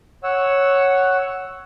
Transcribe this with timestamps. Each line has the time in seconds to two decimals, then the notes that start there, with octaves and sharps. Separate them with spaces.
0.23 C#5 F#5 E6